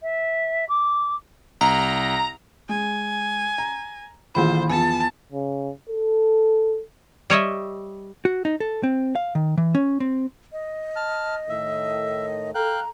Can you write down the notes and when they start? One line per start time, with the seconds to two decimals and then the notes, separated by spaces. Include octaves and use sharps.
0.03 E5
0.69 D6
1.61 C2 A#5
2.69 G#3 G#5
3.58 A#5
4.35 A#1 D#3 E3 E4 F4 C5 B5
4.70 E2 F3 G#5 A5
5.32 C#3
5.89 A4
7.30 G3 C#5 D#5 E5
8.25 F#4
8.45 D#4
8.60 A4
8.83 C4
9.15 F5
9.35 D#3
9.58 E3
9.75 C#4
10.00 C4
10.52 D#5
10.96 A5 F6
11.49 A2 D#3 A3 E5
12.55 A4 F5 G5 A#5 F#6